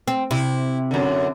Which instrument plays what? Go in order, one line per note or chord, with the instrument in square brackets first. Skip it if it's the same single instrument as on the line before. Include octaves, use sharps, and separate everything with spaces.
[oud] C4
[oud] C3 [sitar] E4
[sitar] F#2 D3